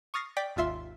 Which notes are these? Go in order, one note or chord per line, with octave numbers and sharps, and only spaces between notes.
C#6 D#6 F6 A6 A#6 C7
D5 G5 D6 B6
G#1 D#2 F4 E5 C6